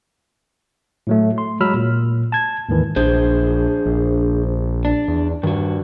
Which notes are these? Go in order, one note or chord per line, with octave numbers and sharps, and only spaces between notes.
A2 F#3 A3
C6
F#3 G#3 B5 E6 F6
A#2
A5 G#6
D#2 G#2 D#3 E3
A#1 D4 G#4 C5
A#1
D4
E2
G2 D#3 F#4